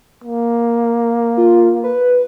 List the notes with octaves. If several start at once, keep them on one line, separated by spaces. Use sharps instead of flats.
A#3
F4
B4